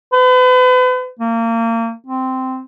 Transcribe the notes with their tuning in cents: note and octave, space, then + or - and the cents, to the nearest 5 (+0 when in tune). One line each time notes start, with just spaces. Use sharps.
B4 +40
A#3 -30
C4 -10